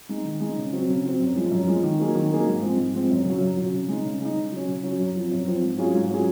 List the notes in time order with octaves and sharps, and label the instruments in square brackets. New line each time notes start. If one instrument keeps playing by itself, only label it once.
[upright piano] G#3 D#4
D#3
G#3 D#4
C#3
F#3 C4
C#3
F#3 C4
F#2
F3 G#3
F#2
F3 G#3
D#3
F#3 A#3 D#4 G#4
D#3
F#3 A#3 D#4 G#4
G#2
F3 G#3 C4
G#2
F3 G#3 C4
F#2
C#3 F#3
F#2
C#3 F#3
C#3
G#3 D#4
C#3
G#3 D#4
C#3
F#3 C#4
C#3
F#3 C#4
F#2
F3 C4
F#2
F3 C4
G#2
F#3 C#4 F4 G#4
G#2
F#3 C#4 F4 G#4